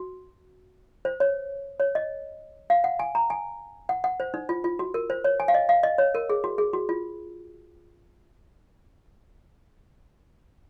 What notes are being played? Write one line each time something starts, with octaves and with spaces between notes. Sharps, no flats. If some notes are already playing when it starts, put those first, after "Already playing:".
Already playing: F#4
C5
C#5
C#5
D#5
F5
F#5
G#5
A#5
G#5
F#5
F#5
C5
D#4
F4
F4
F#4
A#4
C5
C#5
G#5
F5
D#5
F5
D#5
C#5
A#4
G#4
F#4
G#4
F#4
F4